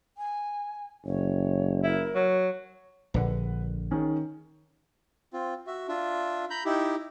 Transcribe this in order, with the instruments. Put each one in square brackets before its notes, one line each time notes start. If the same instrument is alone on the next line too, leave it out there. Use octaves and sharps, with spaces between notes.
[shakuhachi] G#5
[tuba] F#1 [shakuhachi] C#5
[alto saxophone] E4 [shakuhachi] A#4
[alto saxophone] F#3
[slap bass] A#1 D3 [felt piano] B4 F#5
[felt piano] D#3 C#4 G#4
[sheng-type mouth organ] C4 F4
F#4 E5
D4 F4 E5
A#5 B5 G6
D#4 E4 G4